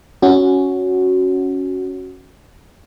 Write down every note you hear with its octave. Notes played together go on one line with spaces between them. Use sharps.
C#4 F#4